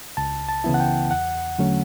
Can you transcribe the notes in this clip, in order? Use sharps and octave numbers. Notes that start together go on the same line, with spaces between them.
C#2 A5
A5
C#3 E3 B3 E4
F#5
G5
E2 F#5
D3 F#3 A3 C#4